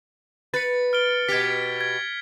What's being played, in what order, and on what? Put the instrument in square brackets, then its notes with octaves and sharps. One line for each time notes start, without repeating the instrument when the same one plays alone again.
[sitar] B4 [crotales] A6 C#7
[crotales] F6 D7 G7
[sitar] B2 G4 [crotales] G#6 B6
[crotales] G#6